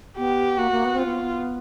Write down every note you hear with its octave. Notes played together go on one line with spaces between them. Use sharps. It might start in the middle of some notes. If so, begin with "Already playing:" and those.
B3 G4
A#3 F#4
A#3
B3
C4 F4
B3